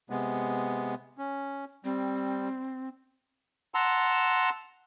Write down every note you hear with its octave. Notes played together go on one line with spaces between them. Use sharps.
C3 G#3 B3
C#4
G3 C4
F#5 A5 A#5 C6 E6